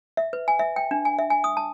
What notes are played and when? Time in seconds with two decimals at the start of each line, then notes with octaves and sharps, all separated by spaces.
0.17 E5
0.33 B4
0.48 G#5
0.59 E5
0.76 G5
0.91 D4
1.05 G#5
1.19 E5
1.30 G#5
1.44 D#6
1.57 A5